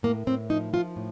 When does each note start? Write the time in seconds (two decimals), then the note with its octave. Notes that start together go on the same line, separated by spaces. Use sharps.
0.03 A2 A#3
0.27 A2 C4
0.50 F3 D#4
0.73 F3 F4
0.96 A2